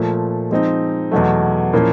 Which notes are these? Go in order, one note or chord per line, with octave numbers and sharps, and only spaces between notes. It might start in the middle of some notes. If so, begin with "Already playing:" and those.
Already playing: A#2 F3 A3
F3 G#3 C4 D#4
E2 B2 F#3 A3
A#2 F3 A#3 C#4 E4